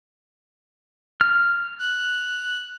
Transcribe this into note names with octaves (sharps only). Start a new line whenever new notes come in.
F6
F#6